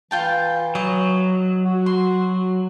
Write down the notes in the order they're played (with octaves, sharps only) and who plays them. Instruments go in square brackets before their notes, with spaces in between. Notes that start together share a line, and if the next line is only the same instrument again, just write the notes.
[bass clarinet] E3 [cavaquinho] F4 G5 A5
[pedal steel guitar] F#3 [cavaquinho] D#5 D6
[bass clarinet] F#4
[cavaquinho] C6